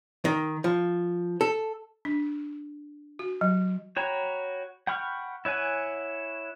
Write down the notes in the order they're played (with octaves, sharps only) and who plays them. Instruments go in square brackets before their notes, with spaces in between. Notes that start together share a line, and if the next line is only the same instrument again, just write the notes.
[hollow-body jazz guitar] D#3
F3
A4
[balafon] D4
F#4
F#3
[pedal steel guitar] F#4 C#5 G5 A#5 B5
F#5 G5 B5 C#6 F6
E4 C#5 F#5 G#5